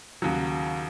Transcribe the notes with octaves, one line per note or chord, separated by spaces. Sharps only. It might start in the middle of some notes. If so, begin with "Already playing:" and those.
D#2 C#3 F#3